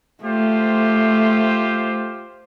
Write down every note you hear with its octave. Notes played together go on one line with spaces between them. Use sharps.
A3 F4 G4 C5